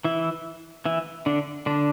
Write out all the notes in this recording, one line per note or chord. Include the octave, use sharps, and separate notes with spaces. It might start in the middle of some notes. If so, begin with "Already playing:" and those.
E3 E4
E3 E4
D3 D4
D3 D4